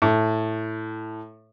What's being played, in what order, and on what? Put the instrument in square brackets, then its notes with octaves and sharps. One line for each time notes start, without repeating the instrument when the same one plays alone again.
[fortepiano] A2